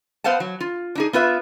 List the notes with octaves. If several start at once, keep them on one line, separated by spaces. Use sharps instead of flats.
B3 B4 C5 F5 F#5 A5
F#3
F4
D4 D#4 G#4
B3 F4 B4 E5